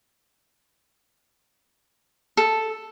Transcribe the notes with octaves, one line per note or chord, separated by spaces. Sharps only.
A4